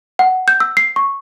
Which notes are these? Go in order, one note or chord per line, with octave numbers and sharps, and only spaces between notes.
F#5
G6
E6
C7
C#6